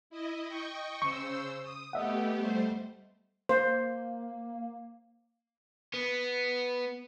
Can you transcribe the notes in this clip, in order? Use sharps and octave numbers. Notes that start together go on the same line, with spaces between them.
E4 D#5
D#5 G5 C#6
C#3 C5 C#6 E6
D#6
A3 B3 G4 D#5 E5 F#5
G3 A3 C5
A#3 C5
B3